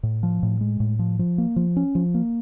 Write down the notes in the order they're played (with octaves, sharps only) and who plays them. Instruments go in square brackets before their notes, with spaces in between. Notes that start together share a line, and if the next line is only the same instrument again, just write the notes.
[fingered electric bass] A2
F3
A2
G#3
A2
F3
F3
A#3
F3
C#4
F3
A#3